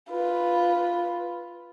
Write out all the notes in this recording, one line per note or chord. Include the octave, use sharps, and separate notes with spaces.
F4 B4